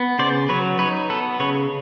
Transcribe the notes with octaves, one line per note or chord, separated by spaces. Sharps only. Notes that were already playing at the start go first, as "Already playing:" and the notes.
Already playing: B3
C#3 C5 D5
F#3 B4 C#5
D#4 B4 C#5
B3 A4 B4
C#3 B4 C#5